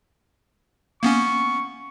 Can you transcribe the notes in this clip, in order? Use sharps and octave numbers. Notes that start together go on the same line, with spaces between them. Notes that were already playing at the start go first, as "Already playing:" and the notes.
A#3 B3 C#4 C#6